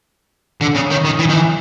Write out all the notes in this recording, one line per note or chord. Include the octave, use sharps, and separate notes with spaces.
D3
C#3
D#3
D#3
E3
D#3
E3